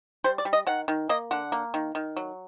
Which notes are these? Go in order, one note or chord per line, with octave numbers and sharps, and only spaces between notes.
G3 C5
D5
G3
D#5
D#3 F#5
D#3
A#3 D#5
D3 F#5
A#3
D#3
D#3
F#3